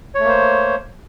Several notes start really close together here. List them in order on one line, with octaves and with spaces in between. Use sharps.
C#5 A3 A#3 C5